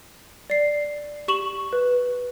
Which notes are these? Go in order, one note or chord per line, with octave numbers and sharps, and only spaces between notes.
D5 C7
G4 C#6 E7 F#7
B4